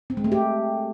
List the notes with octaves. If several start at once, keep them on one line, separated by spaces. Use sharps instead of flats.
C4
G#3
A3
G4